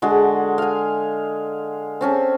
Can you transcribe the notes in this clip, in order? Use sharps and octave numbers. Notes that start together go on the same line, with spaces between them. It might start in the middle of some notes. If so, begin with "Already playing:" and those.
D3 G#3 F#4 A5
F5 G#5
C4 C#4 A5